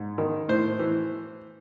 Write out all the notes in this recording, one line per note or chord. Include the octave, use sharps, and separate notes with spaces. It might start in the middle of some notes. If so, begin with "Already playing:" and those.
Already playing: G#2
D#3
A2 C5
E3